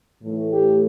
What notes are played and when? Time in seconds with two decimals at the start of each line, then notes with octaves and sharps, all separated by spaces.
0.22 A2 E3 A3
0.51 G4